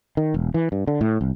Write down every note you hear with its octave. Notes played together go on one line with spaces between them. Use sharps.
D#3
E1
E3
G2
D3
A2
C2